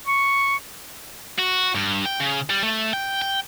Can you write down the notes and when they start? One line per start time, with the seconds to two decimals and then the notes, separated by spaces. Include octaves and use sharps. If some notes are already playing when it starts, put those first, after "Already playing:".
0.07 C#6
1.39 F#4
1.75 G2
2.06 G5
2.20 C#3
2.50 G3
2.63 A3
2.93 G5
3.22 G5